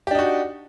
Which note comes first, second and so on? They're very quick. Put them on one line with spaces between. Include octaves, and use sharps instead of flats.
G4 D4 D#4 F#4